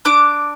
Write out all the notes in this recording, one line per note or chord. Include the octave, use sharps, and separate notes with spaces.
D4 D6